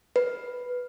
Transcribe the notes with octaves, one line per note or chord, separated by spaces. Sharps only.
B4